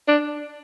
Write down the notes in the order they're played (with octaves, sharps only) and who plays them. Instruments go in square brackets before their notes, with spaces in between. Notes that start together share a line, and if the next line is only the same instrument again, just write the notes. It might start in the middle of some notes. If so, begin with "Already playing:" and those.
[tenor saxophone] D4